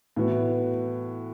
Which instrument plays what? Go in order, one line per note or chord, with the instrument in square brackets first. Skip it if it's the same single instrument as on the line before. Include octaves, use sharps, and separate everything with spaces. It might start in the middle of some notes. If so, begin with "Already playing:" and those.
[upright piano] A2 E3 B3 F#4